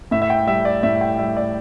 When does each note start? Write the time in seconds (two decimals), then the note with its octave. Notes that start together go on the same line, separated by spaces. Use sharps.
0.11 A2 E5
0.22 E5
0.30 G5
0.47 G3 E5
0.65 D5
0.83 A2 E5
1.01 G5
1.19 G3 E5
1.37 D5